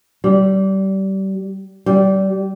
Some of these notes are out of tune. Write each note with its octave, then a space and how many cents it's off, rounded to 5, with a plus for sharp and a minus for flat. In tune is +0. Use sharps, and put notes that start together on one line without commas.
G3 -25
G3 -25